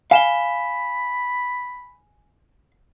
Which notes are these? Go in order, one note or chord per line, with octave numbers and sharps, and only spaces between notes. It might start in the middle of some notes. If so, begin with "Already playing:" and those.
F5 G#5 B5 E7 G7